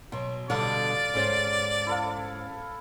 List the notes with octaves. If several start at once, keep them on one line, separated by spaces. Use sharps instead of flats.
B2 F#3 C6
B2 D3 G3 A4 D5 F5
G#2 C#4 C5
E4 A4 F5